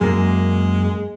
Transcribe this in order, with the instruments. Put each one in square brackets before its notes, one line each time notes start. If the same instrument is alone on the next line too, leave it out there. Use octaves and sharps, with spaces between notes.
[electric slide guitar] F#2 A#3 [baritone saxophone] G#3